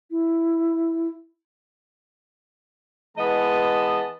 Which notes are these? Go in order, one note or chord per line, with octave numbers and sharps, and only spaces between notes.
E4
E3 G#3 B3 D#5 A5